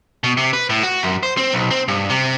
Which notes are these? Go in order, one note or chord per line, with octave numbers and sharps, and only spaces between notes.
B2
C3
B4
A2
F#4
F#2
C5
C4
B1
C4
G2
C3